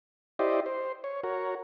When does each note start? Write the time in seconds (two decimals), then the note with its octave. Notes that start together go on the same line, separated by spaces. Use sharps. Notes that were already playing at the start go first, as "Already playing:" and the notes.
0.39 E4 G4 C5 D5 D#5
0.66 C5
1.04 C#5
1.24 F#4 A#4 C#5